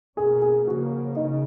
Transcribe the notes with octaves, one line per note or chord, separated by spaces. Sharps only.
B2 A#3 C#4 G#4
G#4
C#3 F3 A#3 F#4
C#3 D#4